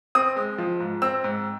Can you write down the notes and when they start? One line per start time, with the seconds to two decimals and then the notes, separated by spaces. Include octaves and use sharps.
0.15 C4 D#6
0.36 G#3
0.58 F3
0.80 G#2
1.02 C4 E6
1.24 G#2